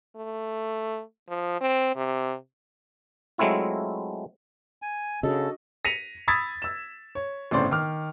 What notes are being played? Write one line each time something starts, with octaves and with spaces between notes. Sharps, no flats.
A3
F3
C4
C3
F#3 G#3 A3 C4 E4 F4
G#5
C#3 D4 F#4 A4 D#5
A#6 B6 C#7 D#7 F7
B5 D#6 E6 G#6 A6 B6
E6 E7
C#5
G1 A2 C#3 C4 D5 C6
D#3 D6 F6